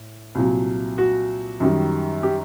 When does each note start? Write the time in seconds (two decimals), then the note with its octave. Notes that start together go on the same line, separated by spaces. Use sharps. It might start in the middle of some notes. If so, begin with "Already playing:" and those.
Already playing: A2
0.35 C2 A#2 F#3
0.98 F#4
1.60 F#2 D#3 G3
2.23 G4